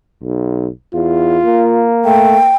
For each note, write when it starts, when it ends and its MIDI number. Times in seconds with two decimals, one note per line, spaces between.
0.22 0.68 35
0.94 1.38 40
0.94 1.91 65
1.45 2.53 58
2.05 2.37 57
2.05 2.56 79